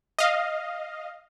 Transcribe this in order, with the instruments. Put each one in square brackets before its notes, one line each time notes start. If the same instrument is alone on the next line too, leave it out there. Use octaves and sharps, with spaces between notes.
[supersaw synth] D#5 F5